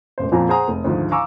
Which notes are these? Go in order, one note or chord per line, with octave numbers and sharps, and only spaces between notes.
E1 A1 C5
F2 A#2 F3 G#5 A#5
G#4 C5 F#5 G#5 A#5 D#6
F1
D2 G#2 D#3 F3
F5 G#5 A#5 C#6 D6 E6